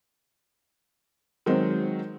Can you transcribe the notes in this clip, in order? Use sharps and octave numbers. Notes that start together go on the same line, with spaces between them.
D#3 F#3 G#3 C4